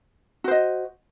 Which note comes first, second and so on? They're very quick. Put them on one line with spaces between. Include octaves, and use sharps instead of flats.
F#4 C5 D#5